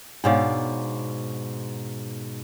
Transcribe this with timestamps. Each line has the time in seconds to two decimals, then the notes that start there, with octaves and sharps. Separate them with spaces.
0.24 G#2 B2 D4 C#5 D5 F5